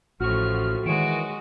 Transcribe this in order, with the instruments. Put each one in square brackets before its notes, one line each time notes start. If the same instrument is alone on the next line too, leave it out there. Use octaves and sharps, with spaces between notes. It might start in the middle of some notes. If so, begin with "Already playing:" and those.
[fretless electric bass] A1 [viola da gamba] A2 F3 [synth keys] F#4 C#6 [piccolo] F6
[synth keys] D#3 C#5 E7 [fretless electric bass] E3 [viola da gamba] G#3 F#4 [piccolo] D7